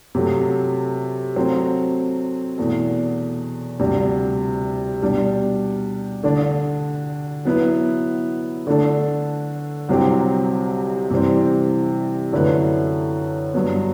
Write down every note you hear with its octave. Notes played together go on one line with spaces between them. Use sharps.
C3 F#3 A3
F#3 A3 C4
E2 B2 A3
D2 C3 G3 D4
B2 G3 D4
D3 A3 D4
F#3 B3 E4 B4
D3 A3 D4 A4
C2 C3 F#3 C4 G4
C3 E3 G3 C4
F#2 D3 A3 E4 B4
G2 F#3 B3